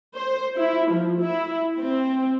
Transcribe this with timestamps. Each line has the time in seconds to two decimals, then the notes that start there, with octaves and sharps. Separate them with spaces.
0.15 C5
0.57 E4
0.91 F3
1.21 E4
1.78 C4